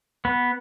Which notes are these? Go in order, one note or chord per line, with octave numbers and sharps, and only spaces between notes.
B3